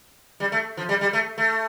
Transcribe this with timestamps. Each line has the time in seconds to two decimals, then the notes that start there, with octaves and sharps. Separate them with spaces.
0.40 G3
0.52 A3
0.77 F3
0.89 G3
1.01 G3
1.13 A3
1.38 A3